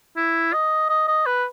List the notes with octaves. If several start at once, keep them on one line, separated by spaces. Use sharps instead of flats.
E4
D#5
D#5
D#5
B4